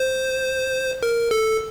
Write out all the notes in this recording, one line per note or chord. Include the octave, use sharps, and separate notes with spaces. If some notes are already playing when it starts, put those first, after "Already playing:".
Already playing: C5
A#4
A4